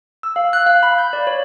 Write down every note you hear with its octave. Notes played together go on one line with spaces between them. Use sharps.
E6
F5
F#6
F5
B5
G6
D5
C#5